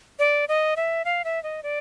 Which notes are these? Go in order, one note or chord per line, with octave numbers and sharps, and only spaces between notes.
D5
D#5
E5
F5
E5
D#5
D5